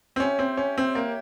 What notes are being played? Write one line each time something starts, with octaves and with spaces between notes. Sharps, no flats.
C4
C#4 G4 C#5 E5
C4
C#4
C4
A#3